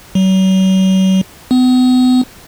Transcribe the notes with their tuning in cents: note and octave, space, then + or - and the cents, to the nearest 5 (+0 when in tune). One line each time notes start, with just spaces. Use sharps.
F#3 +40
B3 +40